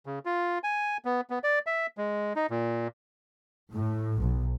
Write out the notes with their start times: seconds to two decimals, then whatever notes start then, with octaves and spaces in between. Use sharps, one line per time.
0.06 C#3
0.25 F4
0.64 G#5
1.05 B3
1.30 B3
1.44 D5
1.67 E5
1.98 G#3
2.36 D#4
2.50 A#2
3.74 A2
4.20 B1